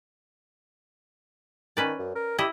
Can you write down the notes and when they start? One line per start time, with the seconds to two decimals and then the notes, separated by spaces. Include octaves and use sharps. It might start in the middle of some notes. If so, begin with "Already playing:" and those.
1.77 D#3 C#4 B4 D5
1.99 F#2
2.15 A#4
2.38 E4 G4 D#5